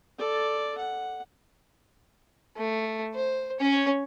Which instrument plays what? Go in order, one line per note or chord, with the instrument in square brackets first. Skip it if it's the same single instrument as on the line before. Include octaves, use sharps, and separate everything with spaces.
[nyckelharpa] A4 D5
F#5
[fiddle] A3
C5
C#4 C#5